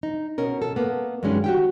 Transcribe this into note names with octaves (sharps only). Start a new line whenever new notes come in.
D#4
B2 C#4 A#4
A4
A#3 B3
G2 D#3 F#3 G#3 C#4
F#4 G4 G5